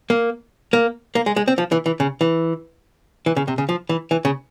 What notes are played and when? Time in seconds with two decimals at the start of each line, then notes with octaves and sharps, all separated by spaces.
0.10 A#3
0.73 A#3
1.15 A#3
1.26 G#3
1.36 G#3
1.48 C4
1.58 F3
1.72 E3
1.86 E3
2.00 C#3
2.21 E3
3.26 E3
3.37 C#3
3.48 C3
3.58 C#3
3.69 F3
3.89 E3
4.11 E3
4.25 C#3